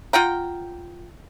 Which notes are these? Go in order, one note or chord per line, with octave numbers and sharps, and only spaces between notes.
F4 F#5 G5 A#5